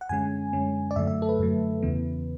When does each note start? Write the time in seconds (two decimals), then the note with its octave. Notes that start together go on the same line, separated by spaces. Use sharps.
0.01 F#5
0.09 F#2 D3 G#3 C#4 G#5
0.53 F#2 D3 G#3 C#4
0.91 D5
0.96 F#2 D3 F#3 A3 E5
1.07 E5
1.22 A4
1.29 B4
1.39 F#2 D3 F#3 A3
1.83 E2 C#3 E3 B3